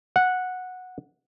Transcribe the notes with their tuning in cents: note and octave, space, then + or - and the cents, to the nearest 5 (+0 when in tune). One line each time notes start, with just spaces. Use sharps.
F#5 -10